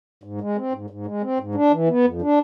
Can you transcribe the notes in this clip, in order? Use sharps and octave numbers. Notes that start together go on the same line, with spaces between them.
G#2
G#3
C4
G#2
G#2
G#3
C4
G#2
D4
E3
B3
F2
D4